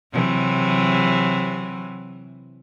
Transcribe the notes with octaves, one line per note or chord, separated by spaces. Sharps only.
C3 E3 F#3